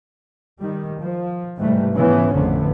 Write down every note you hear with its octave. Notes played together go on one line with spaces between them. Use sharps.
D#3 G3
F3
G#2 C3 E3 G3 A3
G#2 C#3 E3 F3 B3 C#4
A1 F2 D3 B3